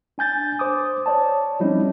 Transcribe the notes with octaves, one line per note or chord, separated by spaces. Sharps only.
D4 G#5 G6 A6
C5 D6 D#6
C#5 D5 A5
F3 G3 C4 C#4 D#4 E4